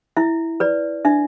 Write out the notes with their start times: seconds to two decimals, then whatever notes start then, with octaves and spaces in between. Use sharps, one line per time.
0.17 E4 E5
0.60 B4 D5
1.05 D4 E5